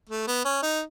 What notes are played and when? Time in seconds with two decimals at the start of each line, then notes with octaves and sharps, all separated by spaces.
0.09 A3
0.27 B3
0.45 C#4
0.63 D#4